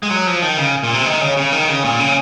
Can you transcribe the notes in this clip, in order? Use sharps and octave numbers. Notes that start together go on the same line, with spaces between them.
G#3
F#3
F3
D#3
C#3
A#2
C3
D#3
C#3
C#3
D#3
C#3
A#2
C#3